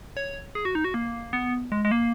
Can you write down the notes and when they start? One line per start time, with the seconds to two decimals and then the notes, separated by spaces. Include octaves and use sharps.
0.17 C#5
0.55 G#4
0.65 F#4
0.75 D#4
0.84 F#4
0.94 A#3
1.33 B3
1.72 G#3
1.85 G#3
1.91 A#3